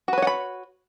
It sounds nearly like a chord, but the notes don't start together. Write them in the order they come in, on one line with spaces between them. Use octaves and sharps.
F#4 B4 C#5 F#5 B5